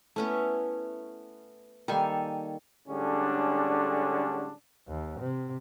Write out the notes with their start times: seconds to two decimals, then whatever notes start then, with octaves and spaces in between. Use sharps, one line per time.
0.16 A3 B3 C#4 E4
1.88 D#3 G3 A#3 A4 C#5 G#5
2.88 A2 D3 G3 G#3 C#4 D4
4.88 D#2
5.20 C3